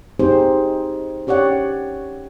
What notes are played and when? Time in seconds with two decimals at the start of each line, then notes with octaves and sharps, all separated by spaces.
0.19 C4 D#4 G4 G#4 C5
1.27 C#4 G4 C#5 D5 F#5